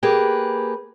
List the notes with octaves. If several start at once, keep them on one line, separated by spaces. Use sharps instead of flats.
A#3 G4 G#4 B4